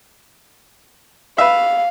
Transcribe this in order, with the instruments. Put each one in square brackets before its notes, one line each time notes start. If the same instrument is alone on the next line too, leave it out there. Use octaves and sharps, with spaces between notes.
[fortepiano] B4 E5 [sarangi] F5